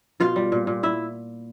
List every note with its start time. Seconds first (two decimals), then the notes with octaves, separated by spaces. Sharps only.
0.20 B2 F4 F5
0.36 G3
0.52 A#2
0.67 A#2
0.83 E4 E5